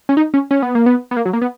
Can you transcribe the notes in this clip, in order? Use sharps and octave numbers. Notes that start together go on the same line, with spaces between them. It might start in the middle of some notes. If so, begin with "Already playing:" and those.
C#4
D#4
C#4
C#4
B3
A#3
B3
B3
A#3
F#3
A#3
B3